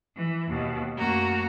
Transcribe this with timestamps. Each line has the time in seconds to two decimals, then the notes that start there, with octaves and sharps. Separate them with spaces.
0.16 E3
0.48 D#2 B2
0.95 F#2 A3 A#3 F#4 A#5